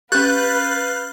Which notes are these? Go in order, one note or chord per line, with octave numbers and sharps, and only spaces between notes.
C#4 G4 B4 F5 F#6 G6 A6